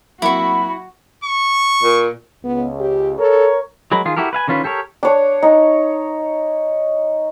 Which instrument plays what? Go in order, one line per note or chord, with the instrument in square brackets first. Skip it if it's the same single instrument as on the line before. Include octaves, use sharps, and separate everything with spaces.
[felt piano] F#3 A#3 C4 [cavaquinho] E4 C#6 [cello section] F#4 [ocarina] B5
[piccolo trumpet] C#6
[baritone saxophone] A#2
[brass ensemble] C#2 [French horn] B3
[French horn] G4
[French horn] A4 [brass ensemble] A#4 C#5
[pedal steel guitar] F#3 G#3 A#4 B5
D#3 F4 G#4
E4 F#4 G4 A4 A#4
B4 F5 G#5
D3 D#3 C#4 F4 B4
G4 A4 A#4 C#5
[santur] D4 C#5
D#4